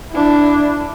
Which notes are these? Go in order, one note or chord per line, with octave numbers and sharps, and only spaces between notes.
D4 E4